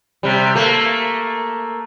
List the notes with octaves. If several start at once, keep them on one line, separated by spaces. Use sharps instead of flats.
C3 G3
A3 A#3